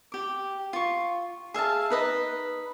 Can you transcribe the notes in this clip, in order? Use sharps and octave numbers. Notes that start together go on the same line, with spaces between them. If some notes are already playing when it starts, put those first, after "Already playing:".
G4 D6
F4 C#6
G#4 E5 F5 A5
D#4 B4 D#5